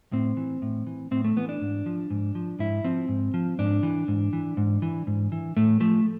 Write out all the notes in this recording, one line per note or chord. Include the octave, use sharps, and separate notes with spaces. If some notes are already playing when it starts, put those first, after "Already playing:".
A2 C4
E3
A2
E3
A2 C4
A3
E3 B3
D4
G#2
F3
G#2
F3
G#2 E4
F3 C4
G#2
F3
G#2 D4
E3
G#2
E3
G#2
E3
G#2
E3
A2 A3
F3 A3